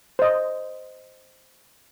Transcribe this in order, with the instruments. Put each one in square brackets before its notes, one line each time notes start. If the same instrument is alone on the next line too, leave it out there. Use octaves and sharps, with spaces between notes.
[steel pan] C5 D#5